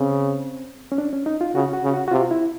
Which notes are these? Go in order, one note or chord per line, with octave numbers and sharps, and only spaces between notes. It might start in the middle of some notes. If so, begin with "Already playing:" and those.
Already playing: C#3 C4
C#4
D4
C#4
D#4
F4
C#3 F#4
F#4
C#3
F#4
F#4
C3 F4
E4